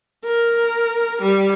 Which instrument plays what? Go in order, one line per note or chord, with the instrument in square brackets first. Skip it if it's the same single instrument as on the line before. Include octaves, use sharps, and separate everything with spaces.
[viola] A#4
G3